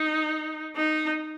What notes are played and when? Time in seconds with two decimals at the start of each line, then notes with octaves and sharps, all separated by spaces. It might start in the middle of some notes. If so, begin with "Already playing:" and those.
Already playing: D#4
0.76 D#4